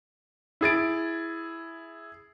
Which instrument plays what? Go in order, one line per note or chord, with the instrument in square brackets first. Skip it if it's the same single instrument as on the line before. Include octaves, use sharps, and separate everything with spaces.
[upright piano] E4 G#4 A6 D7